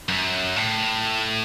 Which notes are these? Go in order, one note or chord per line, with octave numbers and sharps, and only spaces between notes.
F#2
A2